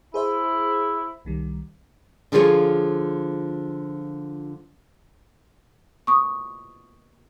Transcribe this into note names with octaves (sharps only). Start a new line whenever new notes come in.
E4 G#4 C5 E5
C2 D#3 G3
D3 F3 F4 G#4 B4 C#5
C#6 D#6